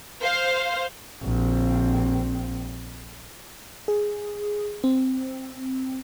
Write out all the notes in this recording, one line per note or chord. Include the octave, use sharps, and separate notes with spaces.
C5 F5
A#1 C4
G#4
C4